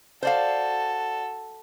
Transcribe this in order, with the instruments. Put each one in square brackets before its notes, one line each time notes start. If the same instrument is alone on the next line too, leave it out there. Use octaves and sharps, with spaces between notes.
[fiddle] F#4 A4 [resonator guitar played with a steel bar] C5 D5 F5